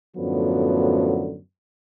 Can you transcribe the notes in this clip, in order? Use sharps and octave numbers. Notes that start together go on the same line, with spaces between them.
F#2 A2 D3 F3 F#3 B3